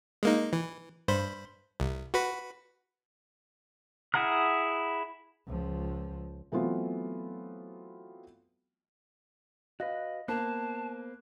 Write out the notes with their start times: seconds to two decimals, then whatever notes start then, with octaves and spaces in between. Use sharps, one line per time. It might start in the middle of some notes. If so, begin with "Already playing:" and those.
0.23 G#3 A#3 D#4
0.53 E3
1.08 G2 C5 B5
1.80 C2
2.14 F#4 B4 B5
4.14 E4 G#4 F#5 A#5 F6
5.47 C#2 F3
6.52 E3 F#3 A3 B3 C4 F4
9.80 F#4 B4 D#5 F5 A#6
10.28 A#3 B3 C5 A5 F#6